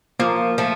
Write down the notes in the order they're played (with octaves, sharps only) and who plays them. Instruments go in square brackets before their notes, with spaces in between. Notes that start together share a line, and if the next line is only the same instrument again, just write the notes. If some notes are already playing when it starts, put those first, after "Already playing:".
[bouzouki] F3 [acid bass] A#3
[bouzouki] F3 A3